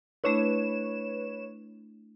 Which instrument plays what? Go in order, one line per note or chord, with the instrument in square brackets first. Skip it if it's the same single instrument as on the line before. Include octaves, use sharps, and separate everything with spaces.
[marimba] A3 D4 E4 [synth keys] B4 C#5 E7